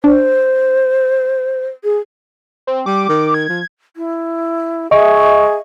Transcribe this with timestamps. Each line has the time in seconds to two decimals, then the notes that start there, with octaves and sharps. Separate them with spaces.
0.04 D4 C5
1.84 G#4
2.67 C4
2.86 G3 D6
3.09 D#3
3.34 G#6
3.49 F3
3.97 E4
4.91 G#4 D#5 E5 C#6